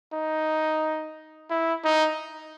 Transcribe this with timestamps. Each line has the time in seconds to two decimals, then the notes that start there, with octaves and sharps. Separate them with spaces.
0.13 D#4
1.50 E4
1.84 D#4